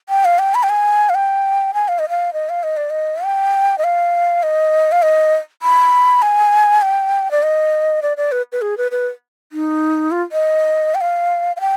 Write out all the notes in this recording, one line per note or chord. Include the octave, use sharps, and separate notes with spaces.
G5
F5
G5
B5
G5
G#5
F5
G5
G#5
F5
D#5
F5
D#5
F5
D#5
D5
D#5
G5
D#5
F5
D#5
F5
D#5
B5
G#5
G5
D5
D#5
D5
D5
B4
B4
G#4
B4
B4
D#4
F4
D#5
G5
F5
F5
G5